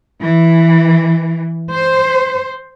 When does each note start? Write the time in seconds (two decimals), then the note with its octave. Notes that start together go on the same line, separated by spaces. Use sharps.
0.20 E3
1.72 C5